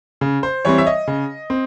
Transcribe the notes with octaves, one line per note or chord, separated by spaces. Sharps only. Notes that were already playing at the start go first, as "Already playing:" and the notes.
C#3
C5
E3 G3 C4 C#5
E5
D#5
C#3
C4